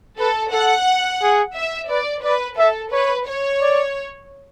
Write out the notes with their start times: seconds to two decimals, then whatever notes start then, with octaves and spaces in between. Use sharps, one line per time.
0.19 A4 B4
0.53 A4 F#5
1.22 G#4
1.56 E5
1.90 B4 D5
2.24 B4 D5
2.58 A4 E5
2.92 B4 C#5
3.28 C#5
3.61 D5